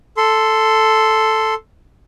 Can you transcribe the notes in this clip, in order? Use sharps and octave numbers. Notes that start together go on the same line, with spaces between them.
A4 C6